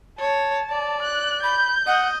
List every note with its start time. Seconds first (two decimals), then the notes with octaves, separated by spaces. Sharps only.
0.19 C#5 A5
0.71 D5
1.03 F#6
1.43 B5 G6
1.87 D#5 F#5